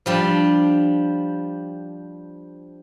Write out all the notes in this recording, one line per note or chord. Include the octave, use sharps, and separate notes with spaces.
F3 G3 D4